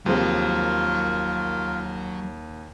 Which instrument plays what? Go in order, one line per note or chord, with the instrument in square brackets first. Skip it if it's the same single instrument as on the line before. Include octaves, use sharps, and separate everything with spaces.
[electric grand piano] D#2 [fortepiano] C3 F3 G#3 [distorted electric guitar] F#3 C#5 [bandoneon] F4 A#4